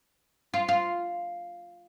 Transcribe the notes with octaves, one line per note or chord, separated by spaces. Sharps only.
F4
F4